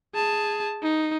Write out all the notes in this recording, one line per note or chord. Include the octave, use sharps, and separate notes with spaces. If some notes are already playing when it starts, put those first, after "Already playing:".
G#4 A5
D#4